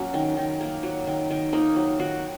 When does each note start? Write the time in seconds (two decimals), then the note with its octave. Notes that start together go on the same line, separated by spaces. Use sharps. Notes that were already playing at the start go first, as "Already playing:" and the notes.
Already playing: F#3 A#3 C#4
0.14 D#3
0.37 D#3
0.61 A#3
0.83 F#3
1.07 D#3
1.30 D#3
1.53 A#3 D#4
1.76 F#3
1.99 D#3 F#4